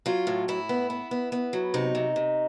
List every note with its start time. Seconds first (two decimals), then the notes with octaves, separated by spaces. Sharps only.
0.06 F#3 F4
0.27 A2
0.48 A2 E4
0.69 B3
0.90 B3
1.11 B3
1.32 B3
1.53 F#3
1.74 C3 D#4
1.95 C3
2.16 C3